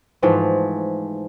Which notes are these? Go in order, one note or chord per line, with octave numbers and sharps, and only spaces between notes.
G#2 E3 F3 A3